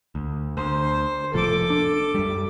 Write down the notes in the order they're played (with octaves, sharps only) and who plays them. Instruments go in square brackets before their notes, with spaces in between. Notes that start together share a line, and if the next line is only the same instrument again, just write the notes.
[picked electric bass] D2
[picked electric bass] D2 [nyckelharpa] C5
[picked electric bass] F1 A2 F3 [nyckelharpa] A4 D6
[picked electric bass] D4
F#2 G3